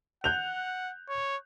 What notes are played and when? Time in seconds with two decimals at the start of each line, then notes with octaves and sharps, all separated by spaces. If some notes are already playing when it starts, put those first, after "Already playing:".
0.24 F#5 F#6 G6 F7
1.09 C#5